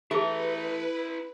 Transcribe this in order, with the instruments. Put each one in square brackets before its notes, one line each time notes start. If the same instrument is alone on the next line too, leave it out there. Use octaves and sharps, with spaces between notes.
[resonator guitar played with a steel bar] E3 A3 [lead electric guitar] E4 A#5 [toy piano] G4 G#4 [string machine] B4